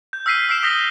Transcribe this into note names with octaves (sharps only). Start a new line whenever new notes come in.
G6
E6 F6 B6 C7 D#7
E6 F6 C7 D7 E7
D#6 G6 A#6 B6 G7